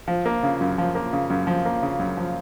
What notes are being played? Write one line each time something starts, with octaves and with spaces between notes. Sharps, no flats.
F3
A#3
C#3
F#2
F3
A#3
C#3
F#2
F3
A#3
C#3
F#2
F3